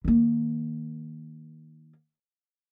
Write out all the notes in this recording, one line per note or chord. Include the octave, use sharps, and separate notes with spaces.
D#3 A#3